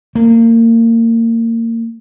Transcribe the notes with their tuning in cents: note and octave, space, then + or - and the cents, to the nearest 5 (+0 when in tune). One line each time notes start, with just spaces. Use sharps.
A#3 -30